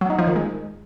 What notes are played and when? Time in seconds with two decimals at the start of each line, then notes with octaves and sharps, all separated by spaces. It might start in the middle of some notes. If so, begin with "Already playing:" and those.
0.01 F#3
0.10 D#4
0.19 F3
0.27 D#3
0.36 G#3